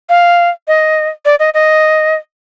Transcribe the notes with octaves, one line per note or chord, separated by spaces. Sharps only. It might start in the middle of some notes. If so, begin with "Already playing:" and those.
F5
D#5
D5
D#5
D#5